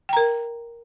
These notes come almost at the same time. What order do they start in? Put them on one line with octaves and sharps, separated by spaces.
G5 A#5 A#4